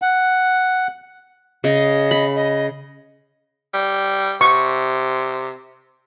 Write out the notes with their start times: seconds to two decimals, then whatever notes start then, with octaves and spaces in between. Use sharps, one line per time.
0.02 F#5
1.64 C#3 D#5
2.11 B5
2.36 D#5
3.74 G3
4.41 C3 C#6